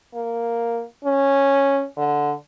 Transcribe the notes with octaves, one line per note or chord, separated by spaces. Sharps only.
A#3
C#4
D3